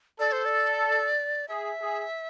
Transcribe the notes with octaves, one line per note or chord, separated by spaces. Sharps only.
A4 D5
C5
D5
G#4 E5
G#4